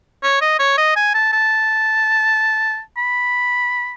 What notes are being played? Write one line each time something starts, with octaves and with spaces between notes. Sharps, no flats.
C#5
D#5
C#5
D#5
G#5
A5
A5
B5